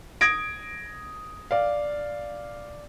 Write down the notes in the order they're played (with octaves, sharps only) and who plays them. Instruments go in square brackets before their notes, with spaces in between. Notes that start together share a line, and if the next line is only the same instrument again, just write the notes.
[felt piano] D#6 G#6 A#6 D7
D5 F5